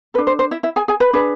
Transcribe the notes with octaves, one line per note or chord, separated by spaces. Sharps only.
D4 A4 B4
C5
C5
E4 E5
E4 E5
G#4 G#5
G#4 G#5
B4 B5
D4 G#4 B4